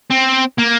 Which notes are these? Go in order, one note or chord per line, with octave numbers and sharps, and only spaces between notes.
C4
A#3